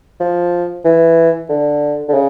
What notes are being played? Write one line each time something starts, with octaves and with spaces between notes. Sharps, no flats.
F3
E3
D3
D3
C#3